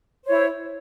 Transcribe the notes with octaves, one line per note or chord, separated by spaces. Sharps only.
E4 C5 C#5